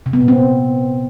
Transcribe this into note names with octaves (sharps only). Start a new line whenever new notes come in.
C3
B3
A#2
C4